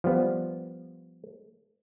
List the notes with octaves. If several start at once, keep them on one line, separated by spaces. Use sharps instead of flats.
F3 G3 B3